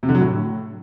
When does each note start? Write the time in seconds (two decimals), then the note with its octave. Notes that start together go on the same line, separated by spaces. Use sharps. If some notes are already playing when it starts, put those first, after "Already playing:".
0.03 C3
0.09 D3
0.15 F#3
0.21 A2